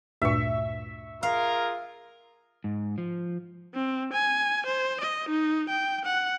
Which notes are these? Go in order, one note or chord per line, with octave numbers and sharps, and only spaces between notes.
D2 G2 A#2 E5 C#6
F4 G#4 A#4 F5
G#2
F3
C4
G#5
C5
D#5
D#4
G5
F#5